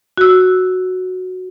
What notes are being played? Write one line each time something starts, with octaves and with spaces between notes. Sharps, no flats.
F#4 E6